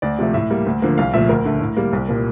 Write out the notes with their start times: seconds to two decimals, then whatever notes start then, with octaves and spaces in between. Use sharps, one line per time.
0.02 D2 D5
0.19 C3 F3 A3
0.34 A2 E5
0.50 G3 A#3
0.67 D2
0.82 D3 F3 A#3
0.98 C2 F5
1.13 A#2 F3 A3 E5
1.29 D2 A#4
1.45 D3 A3
1.61 A2
1.77 G3 A#3
1.93 C2
2.09 A#2 G3 A#3